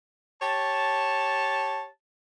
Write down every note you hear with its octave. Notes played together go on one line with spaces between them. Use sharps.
G4 C#5 A5